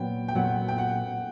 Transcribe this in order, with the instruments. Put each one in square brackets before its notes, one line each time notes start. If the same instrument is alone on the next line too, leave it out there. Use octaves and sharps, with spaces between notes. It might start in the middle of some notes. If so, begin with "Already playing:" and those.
Already playing: [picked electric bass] A#2 F#3 B3 [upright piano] G5
[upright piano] G5
[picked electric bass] A#2 F#3 B3 [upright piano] F#5
[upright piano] G5
F#5